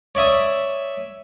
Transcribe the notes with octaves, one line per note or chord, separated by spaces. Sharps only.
C#5 D5 E5 D#6